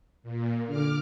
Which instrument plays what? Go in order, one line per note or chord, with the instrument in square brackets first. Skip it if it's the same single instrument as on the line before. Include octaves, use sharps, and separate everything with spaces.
[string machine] A#2
[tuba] D3 [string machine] D6 F6